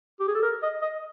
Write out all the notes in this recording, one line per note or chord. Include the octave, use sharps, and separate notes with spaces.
G4
G#4
A4
A#4
D#5
D#5